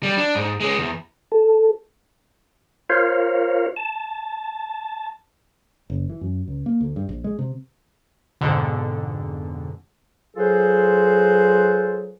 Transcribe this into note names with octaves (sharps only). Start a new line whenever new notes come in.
G3
D4
G#2
G#3 C#4
E2
A4
F4 A#4 C5 C#5 F5
A5
F#1
E3
F#2
C#2
A#3
D2
G2
A#1
G#3
C3
F2 G#2 B2 D3
F#3 F4 G#4 A4 B4 C5